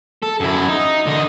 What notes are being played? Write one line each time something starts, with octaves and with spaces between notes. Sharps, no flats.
A4
F#2 E4
D#4
D3 D#4